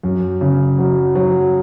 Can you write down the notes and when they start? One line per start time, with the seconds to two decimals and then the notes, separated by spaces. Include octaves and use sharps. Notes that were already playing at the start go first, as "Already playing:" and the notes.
0.03 F#2
0.41 C#3
0.79 F#3
1.15 F#3